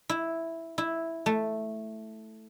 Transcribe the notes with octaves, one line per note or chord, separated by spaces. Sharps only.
E4
E4
A3